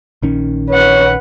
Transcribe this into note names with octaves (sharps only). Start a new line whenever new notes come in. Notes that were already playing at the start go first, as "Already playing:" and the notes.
A#1 D#3 C#4
B4 C#5 F#5